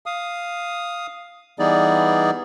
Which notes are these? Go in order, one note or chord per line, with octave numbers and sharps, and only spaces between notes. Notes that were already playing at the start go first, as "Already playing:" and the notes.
F5 D#6
E3 G3 B3 D#4 G#4 D5